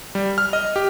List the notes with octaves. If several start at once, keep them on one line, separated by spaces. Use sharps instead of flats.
G3
F6
D#5
G4